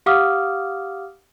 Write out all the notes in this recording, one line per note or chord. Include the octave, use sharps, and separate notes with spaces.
G4 F5 F#5 D6 D#6 F6